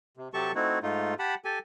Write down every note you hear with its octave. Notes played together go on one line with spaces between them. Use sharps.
C3
C3 F#3 G4 A4 A5 C#6
A3 C4 D#4 E4 F#4
G#2 A3 D#4 F4
G4 F#5 A5 B5
G4 A4 G#5